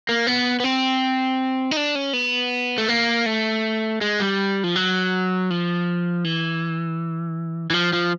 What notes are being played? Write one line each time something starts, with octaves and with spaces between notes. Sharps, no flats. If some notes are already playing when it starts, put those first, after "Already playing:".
A#3
B3
B3
C4
D#4
D4
C#4
B3
A3
A#3
A3
G#3
G3
F3
F#3
F3
E3
E3
F3
F3